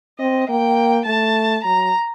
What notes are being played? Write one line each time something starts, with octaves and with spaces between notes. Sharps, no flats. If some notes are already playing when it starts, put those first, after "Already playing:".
C4 D#5
A#3 G5
A3 A5
F#3 A#5